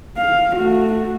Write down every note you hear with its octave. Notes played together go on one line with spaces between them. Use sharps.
F5
A3 F#4